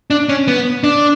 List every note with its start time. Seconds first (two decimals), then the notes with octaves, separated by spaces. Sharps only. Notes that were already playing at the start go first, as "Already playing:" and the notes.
0.10 D4
0.29 C#4
0.48 B3
0.83 D4